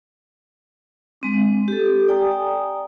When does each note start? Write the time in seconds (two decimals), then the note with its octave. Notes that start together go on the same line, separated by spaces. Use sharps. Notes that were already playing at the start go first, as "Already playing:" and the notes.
1.21 G#3 C4 D4
1.68 G4 A4
2.08 D5 G5 G#5 A#5 D#6